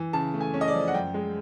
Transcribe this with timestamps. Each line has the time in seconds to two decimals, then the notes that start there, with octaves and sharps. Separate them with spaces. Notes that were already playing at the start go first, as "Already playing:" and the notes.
Already playing: E3
0.13 C#3 A5
0.34 A3
0.41 G#5
0.54 C#4
0.61 D#5
0.68 D5
0.74 F3
0.88 F#5
0.94 F#2 G5
1.14 G#3